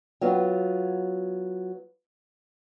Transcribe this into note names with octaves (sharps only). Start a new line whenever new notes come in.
F#3 B3 F4